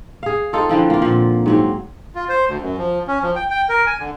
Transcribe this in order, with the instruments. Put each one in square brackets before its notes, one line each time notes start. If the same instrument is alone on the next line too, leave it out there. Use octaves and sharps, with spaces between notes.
[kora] G#4 F5
C4 D#4 F4 A4
D3 E3 F3 C4
A#3 F4
A#2 F3
G#2 F#3 C4
[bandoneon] F4
C5
D2
F#2
F3
C#4
F3
G5
G5
A#4
G#5
D3